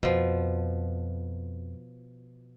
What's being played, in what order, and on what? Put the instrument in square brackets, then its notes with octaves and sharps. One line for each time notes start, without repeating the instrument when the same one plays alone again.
[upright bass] F2 [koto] B2 F3